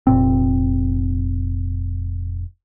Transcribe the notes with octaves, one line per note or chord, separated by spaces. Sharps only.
F1 A#2 C4